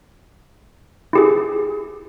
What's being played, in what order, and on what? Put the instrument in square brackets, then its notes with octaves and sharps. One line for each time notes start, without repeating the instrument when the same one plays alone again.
[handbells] E4 G4 G#4